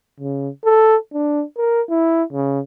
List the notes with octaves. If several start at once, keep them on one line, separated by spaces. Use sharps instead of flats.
C#3
A4
D4
A#4
E4
C#3